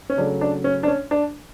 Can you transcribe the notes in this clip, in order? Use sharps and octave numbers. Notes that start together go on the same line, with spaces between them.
C#4
C#3 F#3 A3 D4
D4
C#4
D4
C#4
D4